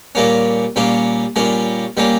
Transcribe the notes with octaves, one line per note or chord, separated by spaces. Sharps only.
A#2 G3 A#3 C#4
A#2 G3 A#3 C#4
A#2 G3 A#3 C#4
A#2 G3 A#3 C#4